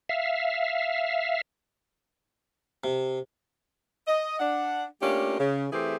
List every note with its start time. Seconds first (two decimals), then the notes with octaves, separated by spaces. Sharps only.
0.09 E5 F5
2.84 C3
4.07 D#5
4.39 D4 F#5
5.01 A3 A#3 C#4 D4 F4 G4
5.39 C#3
5.71 E3 A3 C4 E4 G4 G#4